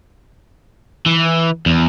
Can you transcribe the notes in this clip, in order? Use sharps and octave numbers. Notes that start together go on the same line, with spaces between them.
E3
E2